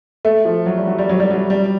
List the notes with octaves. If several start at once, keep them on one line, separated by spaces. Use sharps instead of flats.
A3
F3
F#3
G3
F#3
G3
F#3
G3
F#3
G3